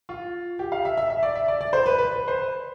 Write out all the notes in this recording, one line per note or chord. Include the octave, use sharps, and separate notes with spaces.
F4
G4
F5
E5
E5
E5
D5
E5
D5
D5
C5
B4
B4
B4
C5